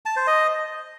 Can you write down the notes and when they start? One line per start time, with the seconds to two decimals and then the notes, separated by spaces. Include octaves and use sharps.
0.06 A5
0.16 C5
0.27 D#5